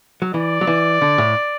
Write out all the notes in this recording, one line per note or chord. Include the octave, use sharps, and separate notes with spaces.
F#3
E3 D5
F#3
E3
D3
A2